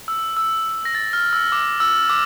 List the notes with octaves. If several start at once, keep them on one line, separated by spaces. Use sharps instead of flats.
E6
E6
A#6
A6
F6
E6
D6
E6
D6